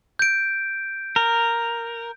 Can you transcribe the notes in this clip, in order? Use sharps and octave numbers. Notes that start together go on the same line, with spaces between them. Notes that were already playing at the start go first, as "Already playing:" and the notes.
G6 D7
A#4